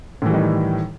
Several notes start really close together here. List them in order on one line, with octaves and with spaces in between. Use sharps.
A2 E3 G3 D#3